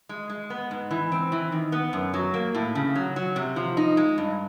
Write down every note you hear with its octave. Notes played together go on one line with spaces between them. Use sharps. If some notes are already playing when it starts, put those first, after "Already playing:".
G#3
G#3
B3
G#2
E3
C4
E3
D#3
B3
F#2
F#3
A#3
A2
C#3
F#3
F#3
C3
F3
D#4
G#3
G2